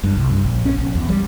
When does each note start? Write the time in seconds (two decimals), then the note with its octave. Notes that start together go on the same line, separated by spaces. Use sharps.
0.04 G2
0.17 C2
0.30 G2
0.45 A#1
0.65 C#4
0.78 A#1
0.95 E2
1.09 G3